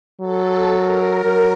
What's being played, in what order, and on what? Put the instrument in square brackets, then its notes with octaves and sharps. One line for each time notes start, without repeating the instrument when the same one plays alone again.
[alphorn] F#3 [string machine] A4
[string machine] A#4
[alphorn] F#3